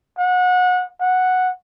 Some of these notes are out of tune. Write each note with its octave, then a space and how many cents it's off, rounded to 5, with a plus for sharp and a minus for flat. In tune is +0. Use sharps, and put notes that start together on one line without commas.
F#5 -25
F#5 -5